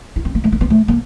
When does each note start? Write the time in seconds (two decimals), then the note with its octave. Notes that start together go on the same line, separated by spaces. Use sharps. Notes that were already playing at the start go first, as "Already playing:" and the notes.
0.16 E4
0.25 C4
0.35 A#3
0.44 A3
0.52 A#3
0.61 B3
0.70 A3
0.88 A#3